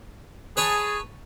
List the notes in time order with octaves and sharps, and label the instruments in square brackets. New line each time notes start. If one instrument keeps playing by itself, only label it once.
[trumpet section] G#4 [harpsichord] B4 C#5 A5